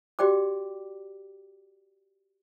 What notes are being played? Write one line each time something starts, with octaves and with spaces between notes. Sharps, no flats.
F#4 G4 D5 G5 D6